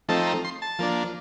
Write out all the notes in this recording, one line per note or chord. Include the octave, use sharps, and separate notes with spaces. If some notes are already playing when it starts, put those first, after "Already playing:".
F3 A3 C4 D#4 A5
A#5
C6
A5
F3 A#3 D4